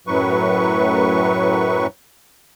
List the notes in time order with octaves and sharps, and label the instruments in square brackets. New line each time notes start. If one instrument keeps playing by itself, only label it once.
[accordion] F#2 A2 F#3 B4 C#6